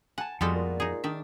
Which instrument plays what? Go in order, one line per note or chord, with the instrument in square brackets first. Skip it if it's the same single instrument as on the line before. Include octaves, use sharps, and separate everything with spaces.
[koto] F#5 [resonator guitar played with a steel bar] G#5 A5
[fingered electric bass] F2 [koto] G3 G#3 A4 [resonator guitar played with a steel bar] B3 F4 F#4
[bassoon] A#2
[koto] D#4 G#4
[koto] D#3 E5 [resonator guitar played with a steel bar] D4